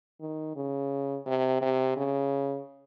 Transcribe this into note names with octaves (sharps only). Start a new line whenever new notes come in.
D#3
C#3
C3
C3
C#3